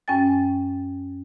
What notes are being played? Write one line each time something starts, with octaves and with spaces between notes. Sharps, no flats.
F#2 C#4 G5 G#5 A6